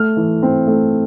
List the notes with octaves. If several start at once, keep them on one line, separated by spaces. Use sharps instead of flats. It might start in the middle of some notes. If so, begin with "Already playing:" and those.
Already playing: A3 F6
E3
C4
A3